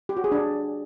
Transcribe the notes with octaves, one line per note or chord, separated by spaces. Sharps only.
G4
F#4
G#4
D4